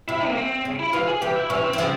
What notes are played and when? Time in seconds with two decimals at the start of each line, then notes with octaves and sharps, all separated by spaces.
0.08 C3 E4
0.28 A#3
0.37 C4
0.65 C#3
0.79 E4
0.93 C3 E3 F4
1.07 G#4
1.21 C3 E3 G4
1.36 E4
1.50 C3 E3 C#4
1.64 C4
1.73 E3
1.78 C#3 F3